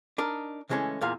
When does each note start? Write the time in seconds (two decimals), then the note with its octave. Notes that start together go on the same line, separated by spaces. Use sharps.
0.18 D4 D#4 A#4
0.70 C#3 E3 G#3 A3 C#4
1.01 E2 A#2 F5